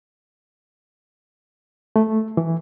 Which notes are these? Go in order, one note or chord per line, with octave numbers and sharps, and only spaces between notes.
A3
E3